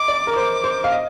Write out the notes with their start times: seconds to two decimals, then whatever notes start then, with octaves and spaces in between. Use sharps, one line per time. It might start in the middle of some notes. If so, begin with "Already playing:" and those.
Already playing: D#5 D6
0.08 D5
0.27 A#4
0.36 C5 D6
0.64 C5
0.84 F5
0.92 D#5